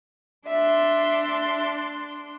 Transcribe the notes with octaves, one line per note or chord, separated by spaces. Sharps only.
D4 E5 C6